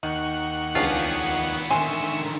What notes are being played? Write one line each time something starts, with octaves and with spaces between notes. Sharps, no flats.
D#2 D#3 F#5 C#6
C#2 B3 C#4 D4 F4 G4 G#4
D3 D#3 E5 G#5 C6 C#6